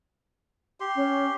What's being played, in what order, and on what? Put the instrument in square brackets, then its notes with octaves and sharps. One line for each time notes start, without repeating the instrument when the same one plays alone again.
[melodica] G4 C6
[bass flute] C#4